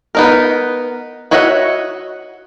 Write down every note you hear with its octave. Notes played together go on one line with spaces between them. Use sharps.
B3 D#4 A#4
F#4 C#5 D#5 E5 F#5